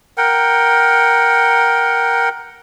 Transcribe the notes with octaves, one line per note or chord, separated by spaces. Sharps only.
A#4 F#5 G5